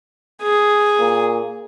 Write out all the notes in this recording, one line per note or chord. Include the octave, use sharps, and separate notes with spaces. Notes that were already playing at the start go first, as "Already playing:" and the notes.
G#4
A#2